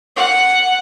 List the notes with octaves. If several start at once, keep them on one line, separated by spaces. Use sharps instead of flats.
F#5